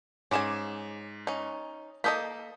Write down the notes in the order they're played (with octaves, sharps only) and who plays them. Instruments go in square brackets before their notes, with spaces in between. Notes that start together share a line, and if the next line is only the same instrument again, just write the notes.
[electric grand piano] G#2 D6 E7 [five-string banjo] C#4 G#4 G#5
[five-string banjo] C#4 D#4
[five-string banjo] A#3 A4 D#5 [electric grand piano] D#6 G6 B6